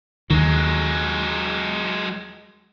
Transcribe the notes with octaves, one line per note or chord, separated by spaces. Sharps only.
D#2 D#3 F#3 G#3